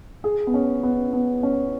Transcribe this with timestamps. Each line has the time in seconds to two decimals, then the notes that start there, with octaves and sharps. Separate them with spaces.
0.24 G#4
0.47 B3
0.54 C#4
0.83 B3
1.13 B3
1.43 C#4